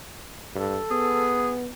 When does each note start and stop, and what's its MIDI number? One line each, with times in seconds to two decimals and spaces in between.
0.55 0.79 43
0.55 1.32 69
0.91 1.69 59
0.91 1.52 68